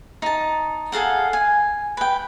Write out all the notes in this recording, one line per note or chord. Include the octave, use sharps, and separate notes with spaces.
D#4 A5
G#4 A4 F5 F#5
G#5
B4 G5